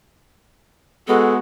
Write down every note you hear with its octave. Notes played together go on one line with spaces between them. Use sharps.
G#3 B3 F#4 A4